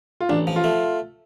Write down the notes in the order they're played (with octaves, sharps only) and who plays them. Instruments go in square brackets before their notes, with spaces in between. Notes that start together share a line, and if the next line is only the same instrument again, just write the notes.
[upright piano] F4
[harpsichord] A1 [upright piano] D4
[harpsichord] F3
[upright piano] F4
[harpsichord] A3